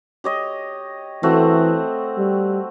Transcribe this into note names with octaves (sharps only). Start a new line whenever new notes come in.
G4 C#5 D#5
E3 A3 C4 F#4
G3